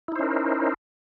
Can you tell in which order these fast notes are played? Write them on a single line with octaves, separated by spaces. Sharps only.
E4 D#4 C5 C#4 A#4